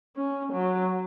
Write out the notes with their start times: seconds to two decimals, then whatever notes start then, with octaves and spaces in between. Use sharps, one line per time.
0.16 C#4
0.53 F#3